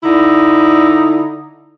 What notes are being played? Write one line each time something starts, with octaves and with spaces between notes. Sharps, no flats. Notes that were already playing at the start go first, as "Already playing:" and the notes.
D3 D#4 E4